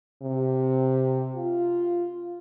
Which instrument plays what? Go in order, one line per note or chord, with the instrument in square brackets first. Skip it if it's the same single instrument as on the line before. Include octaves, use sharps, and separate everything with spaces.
[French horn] C3
F4